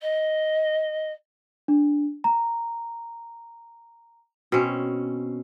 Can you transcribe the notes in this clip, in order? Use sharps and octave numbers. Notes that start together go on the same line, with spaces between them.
D#5
D4
A#5
B2 C4 C#4